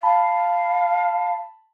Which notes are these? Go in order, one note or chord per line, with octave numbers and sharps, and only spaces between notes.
F5 A5 B5